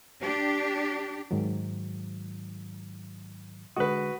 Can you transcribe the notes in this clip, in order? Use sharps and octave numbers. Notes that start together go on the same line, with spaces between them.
D4 G4
G#2 D#3 F#3
D3 G#3 F#4 B4 D#6